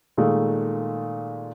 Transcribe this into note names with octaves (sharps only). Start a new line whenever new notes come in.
A#2 D#3 G#3 A3